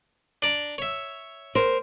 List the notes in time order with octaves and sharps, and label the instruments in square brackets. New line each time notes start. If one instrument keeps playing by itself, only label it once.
[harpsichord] D4 D5 A#5
C#5 E5
[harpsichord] A#4 [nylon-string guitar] C5